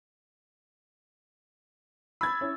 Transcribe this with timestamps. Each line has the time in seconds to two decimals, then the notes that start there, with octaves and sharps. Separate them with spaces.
2.21 B5 E6 G#6 A6
2.41 C#4 E4